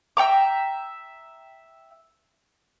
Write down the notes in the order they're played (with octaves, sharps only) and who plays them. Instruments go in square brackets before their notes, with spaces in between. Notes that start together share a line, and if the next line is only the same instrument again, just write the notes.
[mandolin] E5 G5 A#5 D6